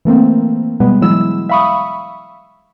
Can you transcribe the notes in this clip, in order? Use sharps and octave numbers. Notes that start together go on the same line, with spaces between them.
E3 A3 A#3 C4
B2 G3 G#3 B3
E3 F#3 G#3 E4 E6
E5 F5 B5 C#6 D#6